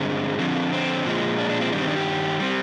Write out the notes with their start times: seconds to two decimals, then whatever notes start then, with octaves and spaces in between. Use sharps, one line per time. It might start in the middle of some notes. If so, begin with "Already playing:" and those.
Already playing: G2 D3 G#3 C4
0.39 D3 F3 C4
0.72 C4
1.05 A#2 F3 G#3
1.39 D4
1.50 D4
1.61 C4
1.72 G2 D#3 G3 D4
1.80 C4
1.88 D4
1.96 G4
2.40 G3 C4